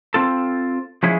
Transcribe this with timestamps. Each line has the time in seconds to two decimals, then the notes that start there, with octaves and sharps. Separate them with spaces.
0.14 C4 F4 A4
1.03 F3 G#3 C#4 E4 G#4